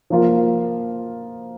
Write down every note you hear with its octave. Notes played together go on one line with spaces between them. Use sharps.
F3 A#3 F4